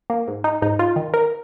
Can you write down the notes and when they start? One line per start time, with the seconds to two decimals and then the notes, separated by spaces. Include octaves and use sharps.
0.10 A#3
0.27 G#2
0.44 D#4
0.62 G#2 D#4
0.79 F4
0.96 D#3
1.14 A#4